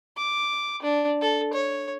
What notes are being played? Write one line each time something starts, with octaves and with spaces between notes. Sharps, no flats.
D6
D4
A4
C#5